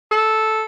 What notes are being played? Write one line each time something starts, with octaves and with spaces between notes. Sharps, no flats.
A4